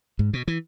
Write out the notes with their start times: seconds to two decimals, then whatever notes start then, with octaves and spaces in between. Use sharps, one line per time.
0.19 G#2
0.33 B2
0.48 E3